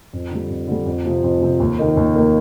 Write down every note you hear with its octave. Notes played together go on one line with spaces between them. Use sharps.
F2
D3 G3
F2
D3 G3
F2
C3 F3 C4
F2
C3 F3 C4
D#2
D#3 A#3 D#4 A#4
D#2
D#3 A#3 D#4 A#4